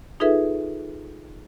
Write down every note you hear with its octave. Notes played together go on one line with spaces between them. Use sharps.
D#4 F4 G#4 A4 B4 E5